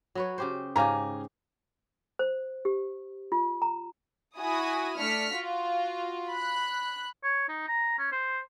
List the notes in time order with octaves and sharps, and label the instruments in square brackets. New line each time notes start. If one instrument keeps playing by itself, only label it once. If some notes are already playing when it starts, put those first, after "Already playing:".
[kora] F#3 B4 C#5
C#3 G4 C5
[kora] G#2 C#3 G4 [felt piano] F5 G#5 A#5
[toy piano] C5
G4
F4
A#5
[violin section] E4 F#4 G#5 D#6
A3 D4 F6 B6 C#7
F4 F#4
B5 F#6
[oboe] C#5
D#4
A#5
C#4
C5